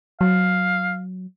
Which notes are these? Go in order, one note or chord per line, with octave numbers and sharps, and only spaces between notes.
F#3 F5